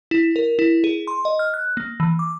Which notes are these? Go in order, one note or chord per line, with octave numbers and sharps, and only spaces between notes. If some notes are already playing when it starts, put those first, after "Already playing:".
E4
A#4
E4
G#4
C6
D#5
F6
F#6
A#3
E3
D6